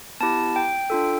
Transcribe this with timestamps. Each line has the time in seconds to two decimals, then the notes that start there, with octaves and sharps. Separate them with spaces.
0.20 B3 E4 G4 A5
0.56 G5
0.90 D4 F4 A4